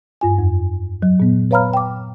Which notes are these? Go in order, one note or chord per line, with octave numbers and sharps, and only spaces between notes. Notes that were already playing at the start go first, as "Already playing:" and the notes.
G2 F4 G#5
F2
F#3
A#2 B3
B4 C#5 F5 A#5 B5 F6
G5 D6